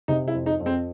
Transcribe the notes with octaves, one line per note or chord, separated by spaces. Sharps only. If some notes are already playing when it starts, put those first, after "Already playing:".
C3 D#4
E4
F2
D#4
F2
C4